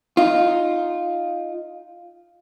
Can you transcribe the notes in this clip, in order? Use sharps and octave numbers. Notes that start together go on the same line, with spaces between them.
D#4 F4